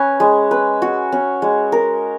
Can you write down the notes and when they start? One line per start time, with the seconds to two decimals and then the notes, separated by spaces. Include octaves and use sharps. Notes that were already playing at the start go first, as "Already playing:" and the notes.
Already playing: C#4 B4
0.20 G#3
0.51 B4
0.82 F#4
1.12 C#4
1.42 G#3
1.72 A#4